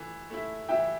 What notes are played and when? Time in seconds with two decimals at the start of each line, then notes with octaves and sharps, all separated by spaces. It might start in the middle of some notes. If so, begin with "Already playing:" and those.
Already playing: E3 A3
0.30 A3 E4
0.68 E3 E5 G5